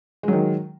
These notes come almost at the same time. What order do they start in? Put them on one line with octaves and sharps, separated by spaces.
G#3 F#3 D#3